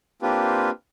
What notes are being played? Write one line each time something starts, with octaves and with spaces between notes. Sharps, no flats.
A#3 C4 D4 F4 G4 B4